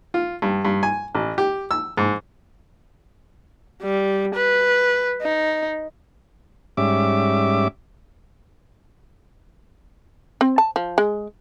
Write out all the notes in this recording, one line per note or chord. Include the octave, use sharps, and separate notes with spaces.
F4
G2
G2
G#5
A1
G4
E6
G#2
G3
B4
D#4
G#2 G3 C#4 E5 D6
C4
A5
F3
G#3